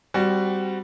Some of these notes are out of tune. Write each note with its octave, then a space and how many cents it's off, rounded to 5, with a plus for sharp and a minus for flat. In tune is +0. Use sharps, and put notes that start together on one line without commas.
G3 +0 C4 -15 F#4 +10